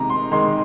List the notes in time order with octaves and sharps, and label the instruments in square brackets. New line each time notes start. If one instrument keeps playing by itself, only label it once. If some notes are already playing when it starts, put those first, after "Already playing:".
Already playing: [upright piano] C3 D#3 G#3 A#5
C6
D#3 G#3 C6